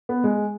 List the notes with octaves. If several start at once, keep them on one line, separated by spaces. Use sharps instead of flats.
B3
G#3